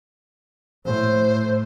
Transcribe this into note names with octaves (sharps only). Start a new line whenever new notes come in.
A2 C5